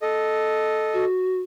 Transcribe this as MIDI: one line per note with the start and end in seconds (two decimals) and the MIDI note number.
0.02 1.05 69
0.02 1.05 75
0.93 1.39 66